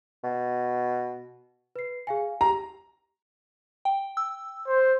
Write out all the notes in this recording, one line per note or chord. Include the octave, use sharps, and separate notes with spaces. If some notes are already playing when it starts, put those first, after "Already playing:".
B2
B4 C7
G#4 F5 G#5
G4 A#5
G5
E6
C5